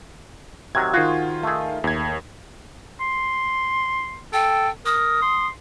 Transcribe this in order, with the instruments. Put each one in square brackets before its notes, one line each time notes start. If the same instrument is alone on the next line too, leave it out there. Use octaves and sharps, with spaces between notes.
[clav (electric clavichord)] C3 D#3 F#3 [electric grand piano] G#6
[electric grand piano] D#3 F4 [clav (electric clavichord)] F#4 G#4 C5
[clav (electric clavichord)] A3 G#4
[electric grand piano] D#2 G#6
[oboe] C6
[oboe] A4 [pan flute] G5
[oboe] A#4 [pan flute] D#6
[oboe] C6